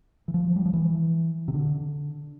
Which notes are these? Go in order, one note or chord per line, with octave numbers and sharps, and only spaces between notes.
E3
F3
G3
F3
E3
C3
D3